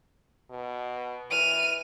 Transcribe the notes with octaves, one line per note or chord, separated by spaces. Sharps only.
B2
E3 F6 D#7